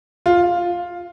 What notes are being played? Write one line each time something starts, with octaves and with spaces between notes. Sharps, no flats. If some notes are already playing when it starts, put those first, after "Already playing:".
F4